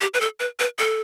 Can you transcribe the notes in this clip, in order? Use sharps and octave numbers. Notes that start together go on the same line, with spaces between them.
G4
B4
A4
B4
B4
A4